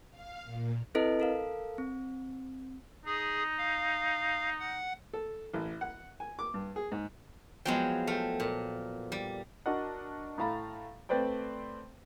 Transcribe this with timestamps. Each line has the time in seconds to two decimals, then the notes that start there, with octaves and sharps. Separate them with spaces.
0.10 F5
0.43 A#2
0.95 C4 E4 A4 B4 D#5
1.20 A4 A#4 F5
1.78 C4
3.06 D#4 G#4
3.58 F5
4.60 F#5
5.13 A4
5.53 A1
5.81 F#5
6.20 G#5
6.39 D6
6.54 G2
6.76 G#4
6.92 G#2
7.65 F3 F#3 G#3 B3 G5
8.07 A3 F5 G5
8.40 A#2
9.12 G3
9.66 D4 F#4 A#4 D#5 F#5
10.38 A2 A3 F5 A#5 B5
11.09 A3 C4 B4 C5 D5 G5